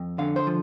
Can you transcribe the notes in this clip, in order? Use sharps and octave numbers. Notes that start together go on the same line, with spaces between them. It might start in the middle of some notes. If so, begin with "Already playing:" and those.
Already playing: F2
D3 F5
C5
F3